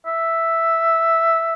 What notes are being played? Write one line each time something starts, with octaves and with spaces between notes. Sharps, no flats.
E5